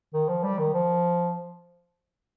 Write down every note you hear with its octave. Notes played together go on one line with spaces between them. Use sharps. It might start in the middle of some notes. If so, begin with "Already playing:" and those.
D#3
F3
G3
D#3
F3